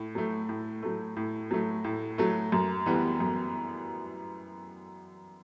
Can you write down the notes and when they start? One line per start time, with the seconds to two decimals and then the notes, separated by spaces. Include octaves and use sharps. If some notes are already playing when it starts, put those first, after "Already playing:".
Already playing: A2
0.15 F#3 A3
0.49 A2
0.83 F#3 A3
1.16 A2
1.51 F#3 A3
1.84 A2
2.18 F#3 A3
2.52 F#2
2.86 E3 G3 B3
3.20 F#2